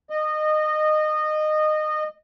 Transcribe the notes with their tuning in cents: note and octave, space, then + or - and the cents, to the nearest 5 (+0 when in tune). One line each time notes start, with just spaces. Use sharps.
D#5 -20